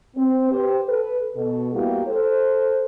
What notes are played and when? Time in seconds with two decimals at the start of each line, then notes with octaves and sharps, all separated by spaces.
0.16 C4
0.50 G4 B4 C5
0.88 A4 B4
1.34 B2 A4
1.73 G3 A#3 B3 E4 F#4 G4
2.07 A4 C5